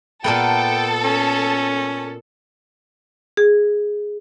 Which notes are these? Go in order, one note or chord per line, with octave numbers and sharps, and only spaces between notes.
A#2 A#3 B3 A4 G5
C#4
G#4